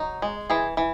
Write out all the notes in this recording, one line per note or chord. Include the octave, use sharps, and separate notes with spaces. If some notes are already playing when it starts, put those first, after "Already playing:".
Already playing: F#3 D#4
G#3
E3 G#4
E3